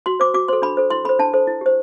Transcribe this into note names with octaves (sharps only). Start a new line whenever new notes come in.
F#4 C6
C5 D6
F#4 D6
A4 C5 C6
D4 B5
A4 C5
E4 C6
A4 C5 B5
D4 A5
A4 C5
E4
G4 C5